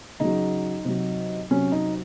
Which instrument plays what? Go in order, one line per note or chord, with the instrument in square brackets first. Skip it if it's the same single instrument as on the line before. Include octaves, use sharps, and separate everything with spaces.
[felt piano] C#3 F#3 D#4
C3 F#3
C3 F#3 C#4
D#4